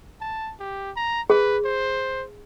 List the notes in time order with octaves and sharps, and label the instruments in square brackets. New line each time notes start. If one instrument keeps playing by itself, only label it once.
[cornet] A5
G4
A#5
[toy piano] G#4 [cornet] B4
[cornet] C5